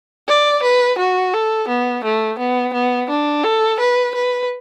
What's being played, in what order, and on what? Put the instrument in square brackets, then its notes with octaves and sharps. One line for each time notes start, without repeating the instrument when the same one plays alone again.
[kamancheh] D5
B4
F#4
A4
B3
A3
B3
B3
D4
A4
B4
B4